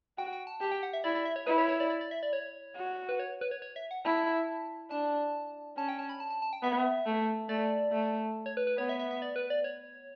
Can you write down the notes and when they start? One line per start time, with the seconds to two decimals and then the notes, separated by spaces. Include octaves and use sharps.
0.18 F#4 G5
0.33 G5
0.47 A5
0.61 G4 A5
0.71 G5
0.83 F#5
0.93 E5
1.04 E4 D5
1.15 D5
1.25 E5
1.36 C#5
1.47 E4 B4
1.58 C#5
1.69 C#5
1.80 D5
1.90 D5
2.01 D5
2.11 E5
2.23 D5
2.33 C#5
2.76 F#4
3.09 B4
3.20 C#5
3.41 B4
3.51 C#5
3.62 C#5
3.76 E5
3.91 F#5
4.05 E4 A5
4.91 D4 A5
5.77 C#4 A5
5.89 G5
5.99 A5
6.09 B5
6.20 A5
6.30 A5
6.42 A5
6.53 G5
6.63 B3 E5
7.06 A3
7.49 A3 D5
7.92 A3
8.46 C#5
8.57 B4
8.67 B4
8.78 B3 C#5
8.89 E5
8.99 E5
9.11 E5
9.22 D5
9.36 B4
9.50 D5
9.64 C#5